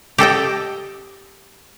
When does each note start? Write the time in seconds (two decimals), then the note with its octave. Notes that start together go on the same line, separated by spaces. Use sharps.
0.18 G4 A4 D#5 G5